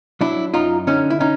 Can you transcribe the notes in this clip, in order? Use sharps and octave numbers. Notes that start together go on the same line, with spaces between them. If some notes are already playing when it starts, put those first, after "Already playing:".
F#3 D4 E4
F#2 D#4 F4
D3 C#4 D#4
E4
C#4 D#4